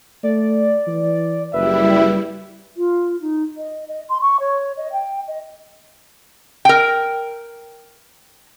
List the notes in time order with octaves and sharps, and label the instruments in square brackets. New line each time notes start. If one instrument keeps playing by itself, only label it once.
[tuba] A3 [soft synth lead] D5
[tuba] E3
[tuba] F#1 [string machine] G3 E4 [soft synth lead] B4 [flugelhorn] E5
[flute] F4
D#4
D#5
D#5
C6
C#6
C#5
D#5
G5
D#5
[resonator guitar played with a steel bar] A#4 G5